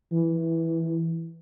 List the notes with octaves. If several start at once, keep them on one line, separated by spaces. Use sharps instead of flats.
E3